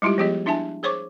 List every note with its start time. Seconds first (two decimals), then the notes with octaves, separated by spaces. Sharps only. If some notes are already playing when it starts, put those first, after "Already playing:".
0.02 G3 G#3 E4 F4 G4
0.18 F3 B3 G4 G#4 D#5
0.46 D4 E4 E5 G#5 A5
0.83 G#4 C5 C#5 C#6 D6